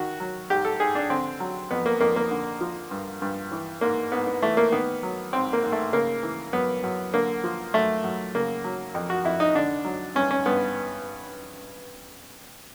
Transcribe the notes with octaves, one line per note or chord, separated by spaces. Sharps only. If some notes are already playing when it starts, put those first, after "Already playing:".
Already playing: D#3 F#4
F#3
G#2 G4
A4
G#2 G#4
D4
D3 C4
F#3
F2 B3
A#3
F2 A#3
A#3
D3
F3
G2
G2
E3
G#2 A#3
G#2 B3
B3
E3 A3
A#3
D#3 B3
F#3
G#2 C4
A#3
G#2
A3
C#3 A#3
E3
F#2 B3
F#2
D3 A#3
F3
F#2 A3
F#2
C#3 A#3
F#3
F2
F#4
F2 E4
D#4
D3 D4
F#3
G2 C#4
C#4
G2 B3